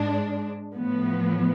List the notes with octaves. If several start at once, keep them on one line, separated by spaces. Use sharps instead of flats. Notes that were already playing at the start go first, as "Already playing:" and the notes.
Already playing: G#2 G#3 D4
A2 F3 B3